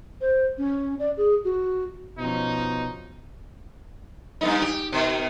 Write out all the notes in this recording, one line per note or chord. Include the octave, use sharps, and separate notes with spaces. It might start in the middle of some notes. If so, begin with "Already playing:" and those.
C5
C#4
D5
G#4
F#4
B2 F3 C#4 D#4
G2 B3 D#4
G4
B2 D#3